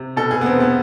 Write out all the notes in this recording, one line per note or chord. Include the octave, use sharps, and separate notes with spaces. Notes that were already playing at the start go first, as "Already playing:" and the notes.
Already playing: C3
B2 A4
G#4
B3
E1 C4
B3